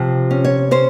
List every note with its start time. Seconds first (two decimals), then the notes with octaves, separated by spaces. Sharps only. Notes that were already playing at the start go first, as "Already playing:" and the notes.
Already playing: C3 F3
0.31 C#4
0.44 C#5
0.71 C#4 C5